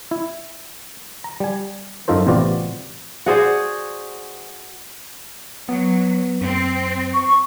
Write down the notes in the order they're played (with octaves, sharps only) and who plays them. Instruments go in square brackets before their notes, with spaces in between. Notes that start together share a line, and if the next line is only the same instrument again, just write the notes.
[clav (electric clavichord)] E4
A#5
G3 G#5
F#2 D#4 F4 A4 C5
A1 C3 B3 F4 F#4 D5
[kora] F#4 G#4 C5 D5
[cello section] F#3 [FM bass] B3
[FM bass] F#2 [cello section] C4
[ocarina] C#6